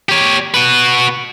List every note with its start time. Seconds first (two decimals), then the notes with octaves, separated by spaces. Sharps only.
0.09 G4 C#5
0.54 F#4 B4